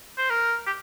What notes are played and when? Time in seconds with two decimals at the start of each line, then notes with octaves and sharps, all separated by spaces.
0.18 C5
0.30 A#4
0.67 G4